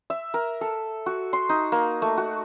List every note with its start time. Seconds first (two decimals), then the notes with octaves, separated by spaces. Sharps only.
0.10 E5
0.34 A#4
0.61 A4
1.06 F#4
1.33 C6
1.49 D#4
1.72 A#3
2.02 A3
2.17 F#4